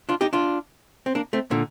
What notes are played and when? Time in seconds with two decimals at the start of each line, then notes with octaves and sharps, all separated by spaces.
0.09 D4 F4
0.21 D#4 G4
0.33 D4 F4
1.06 C4
1.15 A#3 D4
1.33 A3 C4
1.51 A#2 D3